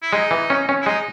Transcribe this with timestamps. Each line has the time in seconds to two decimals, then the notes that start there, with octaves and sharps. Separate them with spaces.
0.02 E4
0.13 G#3 D#4
0.31 E3
0.50 C#4
0.69 C#4
0.82 E4
0.86 G#3 D#4